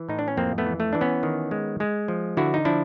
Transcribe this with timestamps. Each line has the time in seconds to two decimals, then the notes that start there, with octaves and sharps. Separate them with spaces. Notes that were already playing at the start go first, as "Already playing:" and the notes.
Already playing: E3
0.09 A2 D#4
0.19 D4
0.28 C#4
0.37 F2 A#3 C4
0.58 A3 B3
0.66 E3
0.80 A3
0.93 E3 D4
1.01 B3 C#4
1.23 D#3
1.51 G#3
1.80 G#3
2.08 F3
2.37 D3 E4 F#4
2.54 D#4
2.65 F3 D4 E4